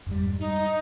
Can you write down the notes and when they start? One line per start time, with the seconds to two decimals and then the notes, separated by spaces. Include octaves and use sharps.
0.06 F2 G#2 G3
0.40 G3 D#4